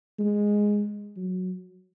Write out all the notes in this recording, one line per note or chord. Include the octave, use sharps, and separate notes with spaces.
G#3
F#3